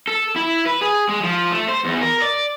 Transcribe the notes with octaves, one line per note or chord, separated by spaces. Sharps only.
A4
E4
B4
G#4
G#3
F3
A3
C5
E2
A#4
D5